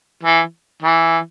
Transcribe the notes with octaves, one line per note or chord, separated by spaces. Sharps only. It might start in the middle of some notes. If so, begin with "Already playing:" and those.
E3
E3